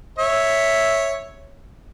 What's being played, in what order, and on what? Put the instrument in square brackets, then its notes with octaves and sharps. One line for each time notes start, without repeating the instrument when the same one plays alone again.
[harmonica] C#5 E5